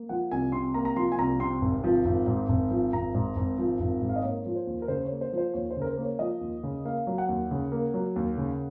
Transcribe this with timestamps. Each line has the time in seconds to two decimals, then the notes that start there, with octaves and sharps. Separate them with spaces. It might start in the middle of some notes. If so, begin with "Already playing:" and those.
Already playing: A#3
0.09 F3 F#5
0.31 C2 G#5
0.52 C3 C6
0.74 A#3 A#5
0.85 A#5
0.96 F3 C6
1.12 G#5
1.18 C2 A#5
1.39 C3 C6
1.61 G#1
1.84 F3
2.05 G#1
2.27 G#2
2.49 G#1
2.71 F3
2.93 G#1 A#5
3.14 G#2
3.36 G#1
3.58 F3
3.80 G#1
4.02 G#2
4.09 F5
4.16 D#5
4.23 A#3 C#5
4.45 F3
4.56 C5
4.67 D#2
4.82 A#4
4.88 C#3 C5
5.05 C#5
5.11 A#3
5.21 C5
5.33 F3 C5
5.54 D#2 C#5
5.70 C5
5.77 C#3 A#4
5.87 C5
5.97 A#3
6.03 C#5
6.19 F3 D#5
6.41 D#2
6.63 C#3
6.85 A#3 F5
7.07 F#3
7.18 F#5
7.29 D#2
7.51 C#3
7.72 A#3
7.94 F#3
8.16 D#2
8.37 C#3